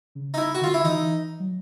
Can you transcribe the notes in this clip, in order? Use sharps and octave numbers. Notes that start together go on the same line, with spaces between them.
C#3
D#4
E4
F#4
D3 F4
E4
E3 D#4
F#3